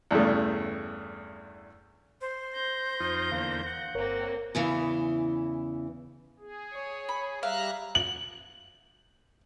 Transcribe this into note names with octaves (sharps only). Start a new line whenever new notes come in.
E2 G2 C#3 A3
C5
G6 A#6
F2 D#4 F4
E2 D3 A#3 F5
F#5
G1 A#3 C4 A#4 C#5
E2 C#3 E3
G#4
C#5
B5
G3 E5 F5 A#5 F#6
F#7